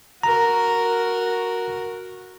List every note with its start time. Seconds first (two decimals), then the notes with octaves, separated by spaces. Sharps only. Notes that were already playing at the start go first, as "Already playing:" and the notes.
0.23 F#4 A#4 A#5